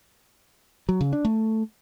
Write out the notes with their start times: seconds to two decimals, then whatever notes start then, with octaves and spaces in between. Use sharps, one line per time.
0.89 F#3
1.01 C#3
1.13 D4
1.25 A3